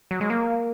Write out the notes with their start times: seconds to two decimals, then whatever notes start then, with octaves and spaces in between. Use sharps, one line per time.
0.11 F#3
0.21 G#3
0.30 A#3